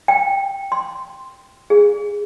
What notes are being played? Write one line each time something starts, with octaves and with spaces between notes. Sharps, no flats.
G5
C6
G#4